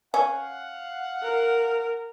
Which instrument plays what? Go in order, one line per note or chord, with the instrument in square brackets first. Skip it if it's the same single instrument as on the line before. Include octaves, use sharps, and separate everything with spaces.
[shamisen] C#4 [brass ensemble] F5 [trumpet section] F#5
[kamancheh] A#4